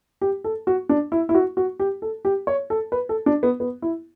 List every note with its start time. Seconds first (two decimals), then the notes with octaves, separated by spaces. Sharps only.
0.21 G4
0.44 A4
0.67 F#4
0.89 D4
1.12 E4
1.29 E4
1.35 F#4
1.57 F#4
1.80 G4
2.02 A4
2.25 G4
2.47 C#5
2.70 A4
2.92 B4
3.09 A4
3.26 D4
3.43 B3
3.60 B3
3.82 E4